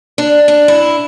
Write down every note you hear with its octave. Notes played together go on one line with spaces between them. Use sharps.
D4
D4
E4